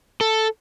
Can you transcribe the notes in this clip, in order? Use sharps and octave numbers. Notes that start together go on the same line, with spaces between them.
A4